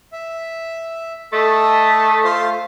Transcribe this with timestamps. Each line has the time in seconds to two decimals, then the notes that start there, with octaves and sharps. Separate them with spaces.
0.12 E5
1.33 A3 A4 D#5
2.24 F4 C5 C6